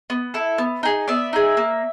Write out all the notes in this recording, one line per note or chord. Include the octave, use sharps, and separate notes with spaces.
B3
E4 A4
B3
D#4 G#4
B3 D5 E5
D#4 G#4
A#3